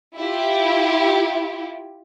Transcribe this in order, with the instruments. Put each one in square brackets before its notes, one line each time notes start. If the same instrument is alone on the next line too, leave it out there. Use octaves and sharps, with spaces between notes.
[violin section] E4 F4 G4